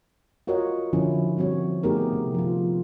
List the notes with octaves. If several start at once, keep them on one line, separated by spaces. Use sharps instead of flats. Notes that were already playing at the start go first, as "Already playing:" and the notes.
F4 F#4 A#4 C#5 D#5 F#5
D3 F3 C#4 E4
F3 G3 C4 F#4 C#5
A3 B3 D#4 G4 G#4 A#4
C3
F3 F4